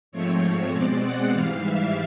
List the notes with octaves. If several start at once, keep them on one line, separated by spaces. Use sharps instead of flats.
G#2 F3 A3 C4 C#5
C#5
B2 G#3 C4 D5
F#5
G#2 E3 G3 F5
E5